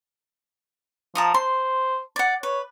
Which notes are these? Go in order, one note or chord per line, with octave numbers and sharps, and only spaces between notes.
F3 A5 A#5 D#6
C5 C6
D5 F#5
B4 C#5